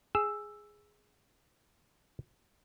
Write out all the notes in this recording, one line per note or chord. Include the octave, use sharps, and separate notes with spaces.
G#4 E6